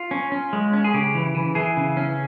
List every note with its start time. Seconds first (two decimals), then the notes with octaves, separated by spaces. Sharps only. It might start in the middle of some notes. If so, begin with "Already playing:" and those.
Already playing: F4
0.11 C#4
0.32 C#4
0.53 G#3
0.73 C#4
0.84 G#4
0.94 C#3 G4
1.15 E3
1.35 E3
1.55 E3 G#4
1.77 C#3
1.97 C#4